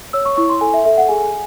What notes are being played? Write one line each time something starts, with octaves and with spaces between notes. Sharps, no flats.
C#5 E6
C#6
E4 C#6
C6
A4 G#5
E5
A4 E5
F#5
G#4 G#5